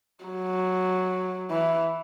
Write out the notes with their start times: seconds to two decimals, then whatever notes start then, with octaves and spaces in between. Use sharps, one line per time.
0.25 F#3
1.50 E3